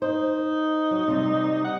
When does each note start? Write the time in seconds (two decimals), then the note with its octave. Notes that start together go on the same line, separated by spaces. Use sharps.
0.02 D#4 C5
0.91 F#3
1.08 C3 G3
1.64 F#5